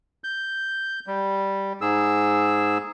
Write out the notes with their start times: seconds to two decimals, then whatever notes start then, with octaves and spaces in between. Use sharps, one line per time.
0.24 G6
1.07 G3
1.81 G#2 G#4 E6